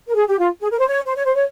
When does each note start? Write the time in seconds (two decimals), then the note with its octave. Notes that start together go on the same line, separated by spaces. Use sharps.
0.08 A#4
0.15 G#4
0.28 G4
0.39 F4
0.61 G#4
0.71 A#4
0.79 C5
0.88 C#5
1.06 C5
1.16 C#5
1.25 C5
1.34 C#5